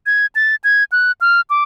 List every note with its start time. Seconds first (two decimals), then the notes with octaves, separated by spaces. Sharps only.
0.06 G#6
0.35 A6
0.64 G#6
0.92 F#6
1.21 F6
1.50 D6